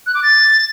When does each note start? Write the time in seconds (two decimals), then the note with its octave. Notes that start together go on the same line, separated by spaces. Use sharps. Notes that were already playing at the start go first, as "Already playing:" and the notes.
0.07 F#6
0.15 D6
0.23 A6